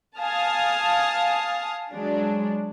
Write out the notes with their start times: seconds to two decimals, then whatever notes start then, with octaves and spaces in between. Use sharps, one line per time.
0.21 F5 G#5 A5 D#6 F6
1.93 F#3 G#3 D4